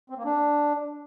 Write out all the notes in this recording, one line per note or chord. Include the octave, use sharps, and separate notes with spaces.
C4
A#3
D4